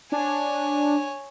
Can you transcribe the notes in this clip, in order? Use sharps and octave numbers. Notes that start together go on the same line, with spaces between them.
D4 C#5 G#5